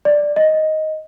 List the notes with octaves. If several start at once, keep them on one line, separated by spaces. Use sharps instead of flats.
D5
D#5